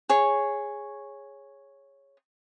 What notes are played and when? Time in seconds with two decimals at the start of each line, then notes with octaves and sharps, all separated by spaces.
0.10 G#4 C#5